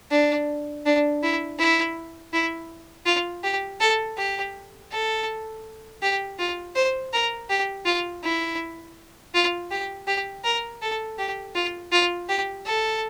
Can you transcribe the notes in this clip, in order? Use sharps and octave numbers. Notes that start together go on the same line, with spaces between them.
D4
D4
E4
E4
E4
F4
G4
A4
G4
A4
G4
F4
C5
A#4
G4
F4
E4
F4
G4
G4
A#4
A4
G4
F4
F4
G4
A4